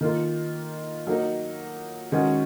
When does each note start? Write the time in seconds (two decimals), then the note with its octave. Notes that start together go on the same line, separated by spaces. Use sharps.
0.01 D#3 A#3 F4
1.07 F#3 A#3 D#4
2.12 D#3 G#3 C#4 F#4